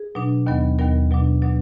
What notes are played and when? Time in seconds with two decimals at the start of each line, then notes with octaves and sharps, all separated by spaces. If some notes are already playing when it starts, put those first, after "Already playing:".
Already playing: G#4
0.15 B2 F#3 D4
0.46 D#2 D#3 F#3 B3
0.79 D#2 D#3 F#3 B3 A#4
1.11 B2 F#3 D4
1.42 B2 F#3 D4